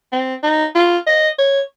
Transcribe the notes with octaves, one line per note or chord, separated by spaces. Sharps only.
C4
D#4
F4
D#5
C#5